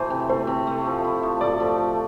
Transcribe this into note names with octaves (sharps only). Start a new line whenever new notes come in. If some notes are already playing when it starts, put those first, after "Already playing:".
Already playing: E3 A3 C5
C3
A3 C5
C3
A3
F3
E4
F3
A3 D5
F3